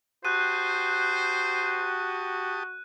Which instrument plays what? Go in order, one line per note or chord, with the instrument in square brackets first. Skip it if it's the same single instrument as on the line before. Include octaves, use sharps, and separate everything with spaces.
[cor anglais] F#4 [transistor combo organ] G4 A5 D#6 [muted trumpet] C5 [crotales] F#6 D#7